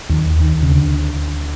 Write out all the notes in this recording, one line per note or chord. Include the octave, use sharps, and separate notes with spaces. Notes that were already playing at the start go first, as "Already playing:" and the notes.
D#2 D#3
D#2 D#3
C#3
D2 D3